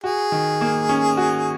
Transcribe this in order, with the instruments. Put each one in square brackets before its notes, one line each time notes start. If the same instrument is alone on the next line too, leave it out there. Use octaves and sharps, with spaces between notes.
[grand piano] F#4 [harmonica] G#4
[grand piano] D#3
A#3
C#4
F#4